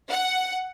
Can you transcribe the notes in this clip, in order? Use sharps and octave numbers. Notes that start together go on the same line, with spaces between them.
F#5